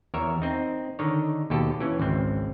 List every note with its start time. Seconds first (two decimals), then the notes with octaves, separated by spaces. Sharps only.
0.14 E2 A#4 C#5 E5
0.42 C4 D#4
0.99 D3 D#3 D#4 C#5
1.50 D#2 B2 G4 A4
1.80 E3 C#4
1.99 G#1 C#2 C4